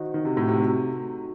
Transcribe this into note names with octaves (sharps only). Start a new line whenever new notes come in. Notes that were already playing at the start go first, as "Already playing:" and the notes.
Already playing: D#3 F#4 C5 D#5 F#5
D#3
C3
A2
C3
D#4 F#4 A4